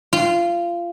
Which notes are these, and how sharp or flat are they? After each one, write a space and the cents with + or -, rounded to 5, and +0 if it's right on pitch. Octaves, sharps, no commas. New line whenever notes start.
F4 -20